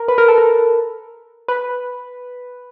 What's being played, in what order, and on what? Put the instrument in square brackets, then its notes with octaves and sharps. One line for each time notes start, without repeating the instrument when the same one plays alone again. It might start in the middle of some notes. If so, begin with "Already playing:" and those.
Already playing: [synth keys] A#4
B4
A#4
A4
A#4
B4